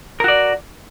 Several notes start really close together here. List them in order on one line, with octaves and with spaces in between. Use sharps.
A#4 F#4 D5